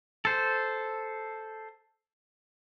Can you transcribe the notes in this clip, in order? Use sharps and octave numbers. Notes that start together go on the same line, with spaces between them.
A4 C5